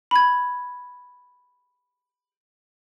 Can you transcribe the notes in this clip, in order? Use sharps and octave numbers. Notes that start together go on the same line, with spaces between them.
B5 G#6